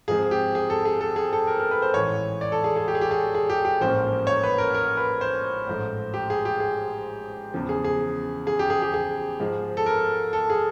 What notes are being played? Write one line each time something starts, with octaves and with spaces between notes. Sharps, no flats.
G#2 F3 G#3 C4 G#4
G4
G#4
A4
G#4
A4
G#4
A4
A#4
A#4
B4
C5
A1 G#2 E3 C#5
D5
A4
G#4
G#4
G4
G#4
G4
G#4
G#4
G4
G4
A1 G#2 F3 A#3 C#4 C5
C#5
B4
A#4
A#4
B4
C5
A1 G#2 F3 A3
G4
G#4
G4
G#4
E2 C#3 F3
G#4
G#4
G#4
G4
G#4
G4
G#4
G#2 F3 G#3
A4
A#4
A4
G#4